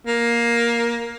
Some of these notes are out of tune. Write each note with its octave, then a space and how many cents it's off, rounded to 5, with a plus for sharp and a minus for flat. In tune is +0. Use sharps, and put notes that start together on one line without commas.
A#3 +10